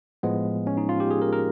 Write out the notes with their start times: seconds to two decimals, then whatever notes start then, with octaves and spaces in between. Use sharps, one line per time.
0.23 A2 F3 G#3 B3
0.67 C#4
0.77 D#4
0.89 F4
1.00 G4
1.11 G#4
1.22 A#4
1.32 A#4